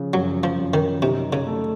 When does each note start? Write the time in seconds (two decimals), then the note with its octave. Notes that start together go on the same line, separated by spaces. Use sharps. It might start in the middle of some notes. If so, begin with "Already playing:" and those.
Already playing: C#3 F3
0.13 F#2 F#3
0.44 F3
0.58 F#2
0.74 D#3
1.02 C3 D#4
1.33 C#3
1.47 A3